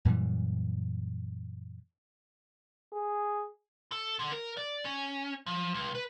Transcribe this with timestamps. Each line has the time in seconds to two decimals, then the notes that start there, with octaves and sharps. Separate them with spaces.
0.05 F#2 A#2 E3 G3
2.93 G#4
3.92 A4
4.19 D3
4.32 A#4
4.57 D5
4.85 C#4
5.46 F3
5.74 C#2
5.95 B4